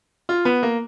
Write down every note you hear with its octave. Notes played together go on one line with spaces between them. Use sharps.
F4
B3
A#3